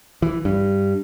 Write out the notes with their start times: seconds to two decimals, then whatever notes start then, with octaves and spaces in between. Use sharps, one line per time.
0.22 E3
0.45 G2